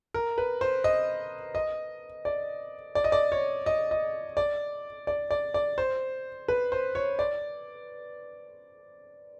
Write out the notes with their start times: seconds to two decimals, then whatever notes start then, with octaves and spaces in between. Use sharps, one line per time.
0.14 A#4
0.38 B4
0.61 C5
0.84 D#5
1.55 D#5
2.25 D5
2.95 D5
3.04 D#5
3.12 D5
3.32 C#5
3.66 D#5
3.91 D#5
4.37 D5
5.07 D5
5.31 D5
5.54 D5
5.78 C5
6.48 B4
6.72 C5
6.95 C#5
7.19 D5